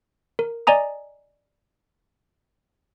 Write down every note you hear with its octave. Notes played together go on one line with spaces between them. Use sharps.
A#4
D5 D#5 G#5 A#5 D#6